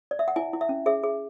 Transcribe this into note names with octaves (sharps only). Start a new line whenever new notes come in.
D5
E5
F#5
E4 G#5
E4
E5
C#4
G#4 E5
G#4